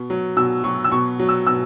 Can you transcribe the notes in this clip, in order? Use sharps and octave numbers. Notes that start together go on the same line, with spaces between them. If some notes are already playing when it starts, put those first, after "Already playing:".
Already playing: B2
F#3
B2 E6
F#3 C#6
E6
B2 C#6
F#3
E6
B2 E6